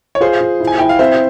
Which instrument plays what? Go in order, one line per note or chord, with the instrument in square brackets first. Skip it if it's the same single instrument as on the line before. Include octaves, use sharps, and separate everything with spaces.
[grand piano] C#5
[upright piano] F4 [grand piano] G#4 C5
[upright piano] F4
E4
[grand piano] G#5
[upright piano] E4 [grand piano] G5
[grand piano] F5
[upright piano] C4 [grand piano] C5 E5